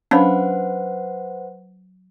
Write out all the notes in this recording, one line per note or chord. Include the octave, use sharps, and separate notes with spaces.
F#3 C#4 D4 B4 C5 F5 F#5 B5